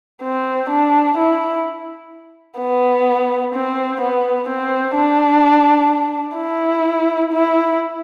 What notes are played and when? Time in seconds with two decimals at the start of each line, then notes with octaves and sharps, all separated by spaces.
0.23 C4
0.70 D4
1.18 E4
2.59 B3
3.54 C4
4.01 B3
4.48 C4
4.96 D4
6.38 E4
7.33 E4